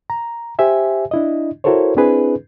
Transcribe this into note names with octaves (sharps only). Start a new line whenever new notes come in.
A#5
G4 C5 E5 G#5
D4 E4 D#5
E4 F#4 A4 A#4 C5 C#5
C4 D4 E4 G#4 B4